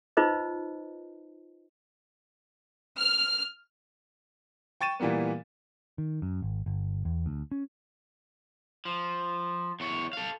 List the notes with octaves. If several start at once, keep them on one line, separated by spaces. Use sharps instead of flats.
D#4 F4 B4 C5 D#5
F6
G5 C#6 A6 D#7 E7
A#2 E3 G3 A#3 B3
D#3
F#2
G#1
G1
E2
D2
C#4
F3
E2 C#5
A4 F5